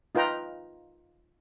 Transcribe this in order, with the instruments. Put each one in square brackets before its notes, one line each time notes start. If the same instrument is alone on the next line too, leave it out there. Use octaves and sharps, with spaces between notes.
[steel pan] D#4 F4 B4 G5 A#5